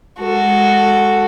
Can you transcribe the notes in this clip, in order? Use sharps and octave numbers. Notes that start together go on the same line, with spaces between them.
G#3 F#4 A4